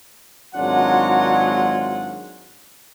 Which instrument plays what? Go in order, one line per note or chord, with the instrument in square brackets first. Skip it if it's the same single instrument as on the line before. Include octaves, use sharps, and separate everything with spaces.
[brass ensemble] G#1 F#3 G#3 D4 F4 F#5